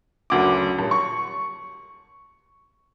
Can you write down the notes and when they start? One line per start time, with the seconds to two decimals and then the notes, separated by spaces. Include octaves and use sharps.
0.30 F#1 D2 D6
0.79 D#1
0.91 C#6